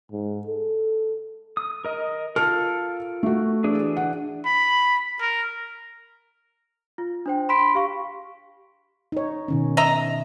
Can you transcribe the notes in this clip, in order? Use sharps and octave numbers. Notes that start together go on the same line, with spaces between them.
G#2
A4
D#6
A#4 D#5
F4 A4 A#4 A5 F6
A3 F#4
E3 D4 G#4
F#5
B5
A#4
F4
D4 C5 G5
B5 C6 B6 D7
G4 F5 C#6
D#4 C#5
B2 D#3 C#4
D#5 E5 A#5